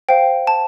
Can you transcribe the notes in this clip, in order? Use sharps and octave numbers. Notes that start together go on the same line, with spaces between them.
C5 F5 G5
A5